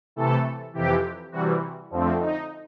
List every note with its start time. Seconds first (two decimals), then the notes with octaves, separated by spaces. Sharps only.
0.16 C3 E3 A3 A4
0.73 F2 C3 E3 G4
1.32 C3 E3 G3 F#4
1.91 F2 D3 F3 A3 C4
2.19 D#4